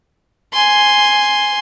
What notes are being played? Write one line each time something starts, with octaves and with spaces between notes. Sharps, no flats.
G#5 C6